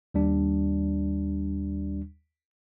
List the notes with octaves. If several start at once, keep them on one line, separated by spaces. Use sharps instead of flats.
D#2 G3 D4